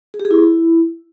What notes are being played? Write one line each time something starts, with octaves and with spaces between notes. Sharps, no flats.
G#4
G4
G#4
E4